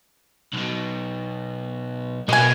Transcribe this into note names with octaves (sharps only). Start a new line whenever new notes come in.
B1 B2
B2 A#3 D#5 G#5